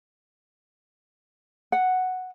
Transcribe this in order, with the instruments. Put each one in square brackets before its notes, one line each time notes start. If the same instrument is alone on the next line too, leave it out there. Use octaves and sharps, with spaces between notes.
[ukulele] F#5